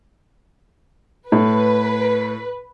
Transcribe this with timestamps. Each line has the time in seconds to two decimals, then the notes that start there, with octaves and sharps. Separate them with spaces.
1.32 A2 B4